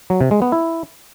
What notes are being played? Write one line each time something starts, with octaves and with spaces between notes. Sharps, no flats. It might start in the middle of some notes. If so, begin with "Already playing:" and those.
F#3
C3
G#3
B3
E4